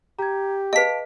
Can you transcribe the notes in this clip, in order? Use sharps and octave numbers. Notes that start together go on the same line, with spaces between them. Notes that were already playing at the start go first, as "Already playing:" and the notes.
G4 A#5 G#6
G#4 B4 D#5 F5 A5 B6 D7